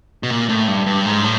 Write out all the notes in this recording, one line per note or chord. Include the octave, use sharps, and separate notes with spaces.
B2
A#2
A2
G2
G2
G#2
A2